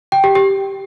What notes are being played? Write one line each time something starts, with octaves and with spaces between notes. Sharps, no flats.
G5
G4
G4